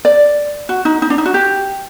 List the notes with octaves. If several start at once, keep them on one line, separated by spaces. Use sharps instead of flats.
D5
F#4
D#4
D#4
D4
D#4
F#4
G4